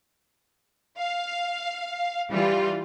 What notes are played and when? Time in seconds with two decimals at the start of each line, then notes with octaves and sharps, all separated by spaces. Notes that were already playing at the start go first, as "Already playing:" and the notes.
0.98 F5
2.31 E3 G3 F4